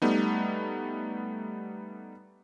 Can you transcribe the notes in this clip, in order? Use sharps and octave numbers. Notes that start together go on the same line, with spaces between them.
G3 A3 B3 D#4